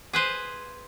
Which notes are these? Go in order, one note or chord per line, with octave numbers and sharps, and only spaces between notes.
G#4 B4 C5